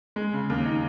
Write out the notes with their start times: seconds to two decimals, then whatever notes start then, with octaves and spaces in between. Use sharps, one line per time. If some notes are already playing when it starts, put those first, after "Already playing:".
0.16 G#3
0.33 C#3
0.50 D#2
0.65 D#4